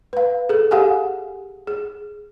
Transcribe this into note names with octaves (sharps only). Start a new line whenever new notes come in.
B4 F5
G#4 A4
G4 G#4 F5 F#5 G#5
G#4